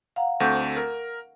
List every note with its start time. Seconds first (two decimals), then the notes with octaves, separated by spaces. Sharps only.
0.16 F5 F#5 A#5
0.40 D2 A3 C4 F#5 C#6 G6
0.77 A#4